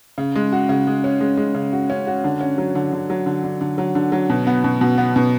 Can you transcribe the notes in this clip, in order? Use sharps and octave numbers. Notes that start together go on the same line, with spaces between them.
C#3
G#3
F#4
C#3
G#3
C#4
G#3
G#3
C#3
F#4
C#4
F#4
D3
C#4
F#3
D3
D3
F#3
D3
D3
D3
F#3
D3
F#3
B2
B3
B2
B2
B3
B2